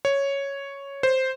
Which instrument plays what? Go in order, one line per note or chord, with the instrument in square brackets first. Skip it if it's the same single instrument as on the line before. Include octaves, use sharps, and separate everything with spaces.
[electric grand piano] C#5
C5